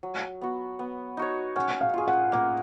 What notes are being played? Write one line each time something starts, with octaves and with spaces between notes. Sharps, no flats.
F#3
B3 F#4
B3
D#4 F#4 C#5
C#4 F#5
F5
F4 G#4
F#5
A#3 F#5